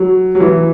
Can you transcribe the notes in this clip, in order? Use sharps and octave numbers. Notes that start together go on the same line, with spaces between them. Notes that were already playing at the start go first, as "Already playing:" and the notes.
Already playing: F#3
F#3
E3